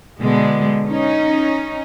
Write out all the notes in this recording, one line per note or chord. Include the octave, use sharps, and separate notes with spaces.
B2 D3 G#3 B3
C#4 D#4